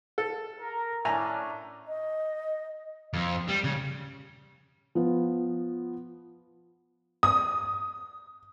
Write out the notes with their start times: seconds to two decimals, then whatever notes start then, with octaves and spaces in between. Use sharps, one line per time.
0.18 A4
0.60 A#4
1.05 A2 C#4 D4 G#5 A#5
1.88 D#5
3.13 F2
3.49 G3
3.64 C#3
4.95 F3 B3
7.23 D#6